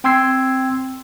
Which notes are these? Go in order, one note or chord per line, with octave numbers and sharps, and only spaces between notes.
C4 G5 C6 E6 G#6 C7